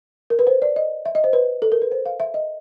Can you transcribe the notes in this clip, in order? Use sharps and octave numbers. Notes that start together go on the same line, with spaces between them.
A#4
B4
C5
D5
D#5
E5
D#5
C5
B4
A4
A#4
B4
C5
F5
E5
D#5